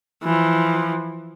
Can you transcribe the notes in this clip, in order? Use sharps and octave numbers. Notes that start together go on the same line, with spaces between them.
E3 F3